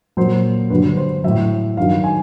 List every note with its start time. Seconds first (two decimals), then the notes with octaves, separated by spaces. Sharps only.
0.17 A#2 F#3 C5
0.70 G2 D3 F#3 B4
0.97 C5
1.24 A2 F#3 E5
1.77 G2 D#3 F#3 F5
2.04 G#5